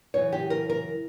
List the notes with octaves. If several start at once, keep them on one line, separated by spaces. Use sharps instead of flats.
F#2 C#3 E3 C#5
G4
A#4
A#4